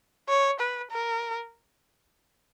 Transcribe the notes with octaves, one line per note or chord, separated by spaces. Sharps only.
C#5
B4
A#4